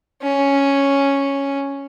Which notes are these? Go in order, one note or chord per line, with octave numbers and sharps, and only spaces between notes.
C#4